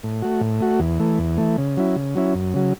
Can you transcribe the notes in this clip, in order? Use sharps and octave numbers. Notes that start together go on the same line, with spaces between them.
A2
A3 F#4
A2
A3 F#4
E2
E3 A3
E2
E3 A3
C#3
F#3 C#4 E4
C#3
F#3 C#4 E4
F#2
C#3 F#3